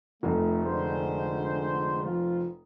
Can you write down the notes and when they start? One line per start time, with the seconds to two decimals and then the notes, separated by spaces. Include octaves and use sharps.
0.23 F1 F2 A3
0.65 D3 G#3 C5
2.03 F3 F4